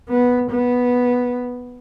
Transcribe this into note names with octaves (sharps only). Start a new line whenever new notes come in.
B3
B3